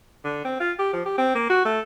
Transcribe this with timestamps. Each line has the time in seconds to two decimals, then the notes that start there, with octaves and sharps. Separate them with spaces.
0.24 D3
0.45 C4
0.60 F4
0.79 G4
0.93 F3
1.06 G4
1.18 C4
1.35 A#3
1.50 F#4
1.65 A3